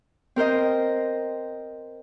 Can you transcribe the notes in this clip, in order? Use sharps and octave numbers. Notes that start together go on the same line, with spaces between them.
C4 A#4 C5 D#5